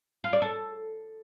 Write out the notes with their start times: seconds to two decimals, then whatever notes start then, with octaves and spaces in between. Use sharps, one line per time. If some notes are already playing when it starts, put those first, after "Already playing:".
0.24 F4
0.33 D5
0.42 A4